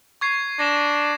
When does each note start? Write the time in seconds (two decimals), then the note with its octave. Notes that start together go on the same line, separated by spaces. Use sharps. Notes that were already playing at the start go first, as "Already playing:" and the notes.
0.21 C#6 G#6 C7
0.59 D4 A#6 C7 E7